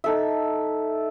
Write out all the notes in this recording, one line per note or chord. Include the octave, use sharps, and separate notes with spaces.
D#4 A4 E5